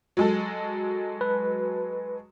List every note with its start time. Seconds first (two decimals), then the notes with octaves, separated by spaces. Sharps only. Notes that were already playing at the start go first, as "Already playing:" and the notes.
0.17 F#3 G#3 A4
1.21 B4